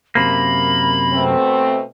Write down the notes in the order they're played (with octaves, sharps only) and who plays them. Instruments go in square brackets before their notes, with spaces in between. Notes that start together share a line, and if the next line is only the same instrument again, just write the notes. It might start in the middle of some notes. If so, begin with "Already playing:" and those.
[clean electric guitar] F#2 C3 A#3 [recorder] B5
[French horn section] B2 A3 C4